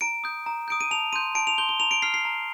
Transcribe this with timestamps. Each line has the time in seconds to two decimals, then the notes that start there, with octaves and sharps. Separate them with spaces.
0.01 A#5 D7
0.24 D#6 G6
0.46 A#5
0.68 D#6 G6 D7
0.81 D#7
0.91 A5 F7
1.13 C6 G6 D#7
1.35 A5 D7
1.47 F7
1.58 C6 G6 G7
1.69 G7
1.80 A#5 F7
1.91 D7
2.02 F6 C7
2.14 C7
2.25 A#5